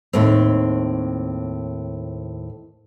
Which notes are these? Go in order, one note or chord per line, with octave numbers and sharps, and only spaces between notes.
D#2 A2 C4